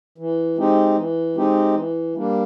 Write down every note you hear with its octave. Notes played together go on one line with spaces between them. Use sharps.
E3
G#3 C4 D#4 G4
E3
G#3 C4 D#4 G4
E3
G3 A#3 D4